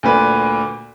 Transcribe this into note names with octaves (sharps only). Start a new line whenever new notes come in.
D2 A#2 B4